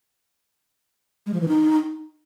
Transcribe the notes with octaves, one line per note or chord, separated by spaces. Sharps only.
G#3
F3
E3
D#4